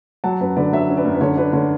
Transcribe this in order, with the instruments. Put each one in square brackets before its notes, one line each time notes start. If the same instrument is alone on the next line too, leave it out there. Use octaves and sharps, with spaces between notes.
[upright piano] F#3 F#5 A5
F#2 B4
D3 B4 D5
F#3 C#5 E5
C#4
B4 D5
F#2
B4
D3 C#5
D4 B4
D3 C#5